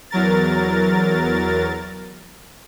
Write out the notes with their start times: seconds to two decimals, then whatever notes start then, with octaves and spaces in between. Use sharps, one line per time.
0.11 E2 F#3 A#4 A6